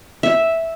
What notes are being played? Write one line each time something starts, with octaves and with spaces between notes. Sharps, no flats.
E5